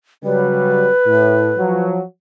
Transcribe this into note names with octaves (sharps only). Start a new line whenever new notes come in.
C#3 F#3 G3 B4
A2
F3 F#3